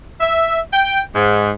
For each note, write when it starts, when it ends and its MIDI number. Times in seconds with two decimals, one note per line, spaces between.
0.20 0.59 76
0.73 1.01 79
1.15 1.50 44